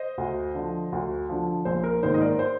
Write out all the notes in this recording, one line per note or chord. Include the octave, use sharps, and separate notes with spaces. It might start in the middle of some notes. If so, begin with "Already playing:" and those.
Already playing: C5 D#5
D2
D3 F3
D2
D3 F3
A#1 C5
A#4
G#2 D#3 A#3 D#4 C5
D#5
A#4 D5
C5